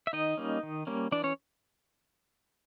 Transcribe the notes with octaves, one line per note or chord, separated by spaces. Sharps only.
E5
D#3 D#4 D#5
G3 A#3 C#4
D#3
G3 A#3 C#4
E3 D4 D5
C#4 C#5